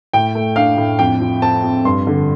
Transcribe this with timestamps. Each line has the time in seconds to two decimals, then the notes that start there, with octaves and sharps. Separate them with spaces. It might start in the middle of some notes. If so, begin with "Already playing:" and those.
0.13 A2 G5
0.35 A3
0.56 D4 F5
0.77 A2
0.99 F2 G5
1.21 F3
1.42 C4 A5
1.64 F2
1.85 G2 C6
2.07 D3